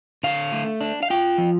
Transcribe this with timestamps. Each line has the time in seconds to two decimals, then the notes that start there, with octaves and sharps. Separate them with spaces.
0.23 D3 F5
0.52 A3
0.81 D4
1.03 F5
1.10 F4 G5
1.38 F3